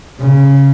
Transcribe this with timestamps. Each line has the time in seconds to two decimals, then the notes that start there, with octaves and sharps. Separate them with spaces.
0.19 C#3